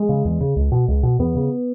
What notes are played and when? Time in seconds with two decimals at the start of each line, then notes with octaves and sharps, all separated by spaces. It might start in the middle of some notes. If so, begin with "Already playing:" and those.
Already playing: G#3
0.09 C#3
0.25 E2
0.41 C#3
0.56 C#2
0.72 B2
0.88 C#2
1.03 B2
1.19 E2 B3
1.35 C#3